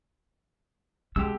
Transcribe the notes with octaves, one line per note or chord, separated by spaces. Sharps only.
B2 G#3 C#4 G4 E6